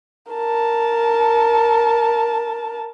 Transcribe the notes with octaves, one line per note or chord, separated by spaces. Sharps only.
A#4 A5